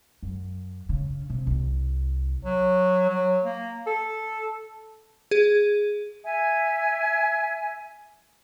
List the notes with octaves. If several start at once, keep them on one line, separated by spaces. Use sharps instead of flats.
F#2
C#3
C3
C2
F#3
F#3
A#3
A4
G#4
E5 G#5